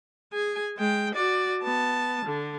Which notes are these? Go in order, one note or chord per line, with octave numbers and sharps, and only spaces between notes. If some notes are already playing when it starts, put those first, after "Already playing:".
G#4 G#5
G#3 G5
F#4 D5
B3 A5
D3